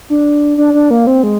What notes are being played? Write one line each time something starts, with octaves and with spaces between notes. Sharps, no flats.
D4
D4
D4
A#3
C4
G#3